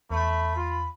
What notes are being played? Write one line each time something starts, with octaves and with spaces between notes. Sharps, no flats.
E2 A3 B5
F4